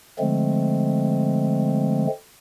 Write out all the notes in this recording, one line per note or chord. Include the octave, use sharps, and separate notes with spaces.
D3 F3 G#3 A3 C4